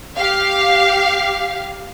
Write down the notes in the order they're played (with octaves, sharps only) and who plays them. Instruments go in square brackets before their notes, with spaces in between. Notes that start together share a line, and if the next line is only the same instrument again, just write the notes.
[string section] G4 F5